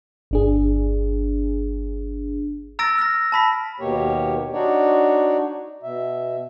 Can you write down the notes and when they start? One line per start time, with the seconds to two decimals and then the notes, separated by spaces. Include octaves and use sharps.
0.31 G1 D4 G#4
2.79 A#5 E6 A6 A#6 D7
2.98 F6 A#6
3.32 A5 B5 B6
3.80 D#2 B2 A#3 G4 C#5
4.53 D4 D#4 F#4 C#5 D5
5.83 B2 E5